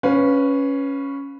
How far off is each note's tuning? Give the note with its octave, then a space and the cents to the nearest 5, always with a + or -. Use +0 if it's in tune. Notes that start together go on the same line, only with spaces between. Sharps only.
C#4 +0 B4 +0 F5 +15